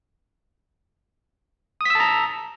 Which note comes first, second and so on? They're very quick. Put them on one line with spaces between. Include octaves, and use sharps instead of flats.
D#6 B6 E6 A5 A#5